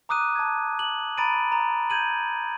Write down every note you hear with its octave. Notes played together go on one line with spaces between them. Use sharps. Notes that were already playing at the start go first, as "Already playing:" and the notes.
A#5 D6 D#6 F#6 D#7
A5 G#6
F#7
A#5 B5 A6 D7 D#7
A#5
G6 G#6 D#7 F#7